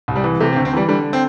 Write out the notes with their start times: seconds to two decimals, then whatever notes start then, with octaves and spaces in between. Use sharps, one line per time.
0.08 C2
0.16 G3
0.24 E3
0.40 C3 A3
0.53 C4
0.56 D2
0.65 C4
0.73 E3 G3
0.89 D3 G3
1.13 C4